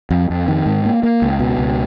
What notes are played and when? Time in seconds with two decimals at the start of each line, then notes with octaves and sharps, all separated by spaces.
0.11 F2
0.30 F2
0.48 D#3
0.66 G#2
0.85 A#3
1.03 A#3
1.22 C#2
1.40 B2
1.58 C#2